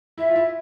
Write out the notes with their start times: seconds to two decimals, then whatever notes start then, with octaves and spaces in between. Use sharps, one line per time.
0.18 E4 E5
0.30 F4
0.36 E4